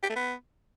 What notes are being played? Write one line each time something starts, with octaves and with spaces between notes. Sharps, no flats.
G4
A3
B3